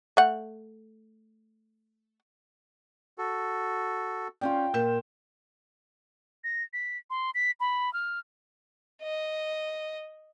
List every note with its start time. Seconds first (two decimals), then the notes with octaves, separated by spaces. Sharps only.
0.17 A3 F#5
3.18 F#4 A4
4.41 C#4 F4 D5 G5
4.74 A#2 A#4 G6 E7
6.44 A#6
6.73 B6
7.10 C6
7.34 B6
7.60 B5
7.93 F6
9.02 D#5